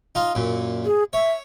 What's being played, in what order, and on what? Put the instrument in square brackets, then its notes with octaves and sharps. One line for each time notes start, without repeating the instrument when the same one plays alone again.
[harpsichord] D#4 F4
F#2 A#2
[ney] G#4
[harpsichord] C#5 [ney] E5